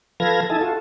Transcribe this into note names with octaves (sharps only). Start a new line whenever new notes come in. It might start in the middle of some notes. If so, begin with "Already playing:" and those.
F3 A4 B4 F5 G#6 A#6
D#4 E4 A4 G#5 A5
F4 F#4 A4